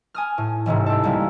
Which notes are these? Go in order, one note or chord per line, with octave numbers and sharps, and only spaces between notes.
G#5 D#6 F6
A2
E1 A1 G#2 C3
G4 A4
C#2 G3 A#3